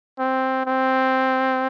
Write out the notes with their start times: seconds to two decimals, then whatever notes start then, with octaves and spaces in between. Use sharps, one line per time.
0.19 C4
0.66 C4